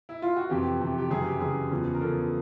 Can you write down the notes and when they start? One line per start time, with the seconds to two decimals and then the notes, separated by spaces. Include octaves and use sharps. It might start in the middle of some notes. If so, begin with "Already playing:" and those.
0.09 E4
0.22 F4
0.36 F#4
0.49 F2 C3 E3 G4
0.80 F2 C3 E3
0.98 G4
1.10 F#2 C#3 E3 G#4
1.26 G4
1.40 F#2 C#3 E3 G#4
1.71 E2 C#3 F3
1.95 A#4
2.01 E2 C#3 F3 A4